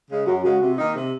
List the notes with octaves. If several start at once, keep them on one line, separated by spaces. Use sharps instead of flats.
C#3 G#3
F#2 F#4
C#3 G#3 F#4
C3
D#3 A#3 D#4
C3